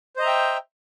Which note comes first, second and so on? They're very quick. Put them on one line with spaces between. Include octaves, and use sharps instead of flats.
C5 D#5 A#5 E5 G5